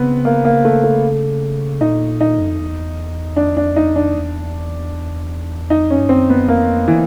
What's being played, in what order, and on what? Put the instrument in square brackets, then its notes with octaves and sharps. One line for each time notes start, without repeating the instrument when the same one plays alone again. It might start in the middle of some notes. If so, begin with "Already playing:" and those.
Already playing: [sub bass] C#3 [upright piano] B3 C4
[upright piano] A#3
A#3
A3
A3
[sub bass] A#2 [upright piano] D#4
[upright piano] D#4
[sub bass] F#2
F2
E2
[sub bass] F2 [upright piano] D4
[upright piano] D4
D#4
D4
[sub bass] E2
[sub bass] F2 [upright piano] D#4
[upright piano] C#4
[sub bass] G2
[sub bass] F#2 [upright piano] C4
[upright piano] B3
[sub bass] F2 [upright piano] A#3
[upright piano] E3